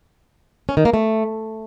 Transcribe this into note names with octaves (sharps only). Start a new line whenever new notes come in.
C#4
D#3
A#3
A3